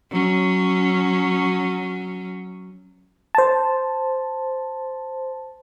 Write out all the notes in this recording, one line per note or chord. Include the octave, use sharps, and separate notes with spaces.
F#3 C#4
C5 A5